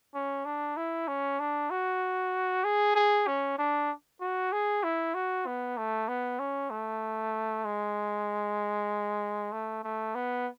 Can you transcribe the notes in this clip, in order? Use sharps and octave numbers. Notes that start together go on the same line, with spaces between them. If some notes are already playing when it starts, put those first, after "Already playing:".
C#4
D4
E4
C#4
D4
F#4
G#4
G#4
C#4
D4
F#4
G#4
E4
F#4
B3
A3
B3
C#4
A3
G#3
A3
A3
B3